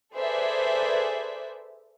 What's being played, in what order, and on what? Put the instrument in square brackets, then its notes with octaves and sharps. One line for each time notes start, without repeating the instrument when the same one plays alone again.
[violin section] G#4 A4 B4 C5 D5 E5